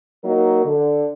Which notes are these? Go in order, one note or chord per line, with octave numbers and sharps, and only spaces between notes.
F#3 A#3 D#4 A#4
D3